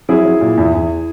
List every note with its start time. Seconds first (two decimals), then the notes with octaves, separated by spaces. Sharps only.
0.09 F#3 E4 G#4
0.25 F#3
0.41 A#2
0.57 E2
0.74 E2